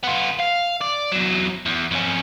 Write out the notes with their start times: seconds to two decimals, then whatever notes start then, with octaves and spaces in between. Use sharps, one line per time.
0.04 B3 F4
0.40 F5
0.82 D5
1.12 E2 F#3
1.66 E2
1.91 F2 C#4